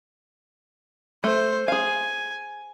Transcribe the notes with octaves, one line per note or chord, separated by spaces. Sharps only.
A3 C5
G#4 F5 G#5